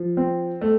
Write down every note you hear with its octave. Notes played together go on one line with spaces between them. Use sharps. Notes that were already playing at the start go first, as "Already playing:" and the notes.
Already playing: F3
C4
A3